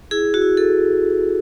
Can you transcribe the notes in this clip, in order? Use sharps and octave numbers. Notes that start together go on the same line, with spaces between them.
E4 G#4
F#4
E4
A4